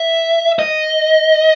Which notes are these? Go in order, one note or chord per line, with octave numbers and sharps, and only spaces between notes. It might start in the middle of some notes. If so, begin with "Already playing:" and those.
Already playing: E5
D#5